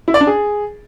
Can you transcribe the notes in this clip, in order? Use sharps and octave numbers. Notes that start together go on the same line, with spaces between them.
E4
D5
D4
G#4